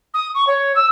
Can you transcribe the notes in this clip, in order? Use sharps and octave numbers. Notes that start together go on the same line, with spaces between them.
D#6
C#6
C#5
E6